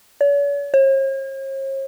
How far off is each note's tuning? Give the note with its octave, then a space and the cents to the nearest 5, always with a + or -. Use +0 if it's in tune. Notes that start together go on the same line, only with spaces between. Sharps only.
C#5 +45
C#5 -45